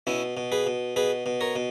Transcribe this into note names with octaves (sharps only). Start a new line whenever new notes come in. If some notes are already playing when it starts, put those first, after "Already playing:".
B2 C#4 E4
B2
G#4 B4
B2
B2 G#4 B4
B2
A#4 C#5
B2